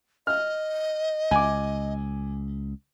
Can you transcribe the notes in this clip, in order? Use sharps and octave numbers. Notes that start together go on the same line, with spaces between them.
D#5 F6
C#2 G#5 D6